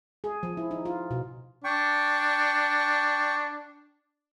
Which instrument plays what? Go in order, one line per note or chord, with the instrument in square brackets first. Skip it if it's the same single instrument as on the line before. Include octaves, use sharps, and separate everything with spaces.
[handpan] G#4
F3
E4
D#4
F4
B2
[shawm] D4 [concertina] G5 C#6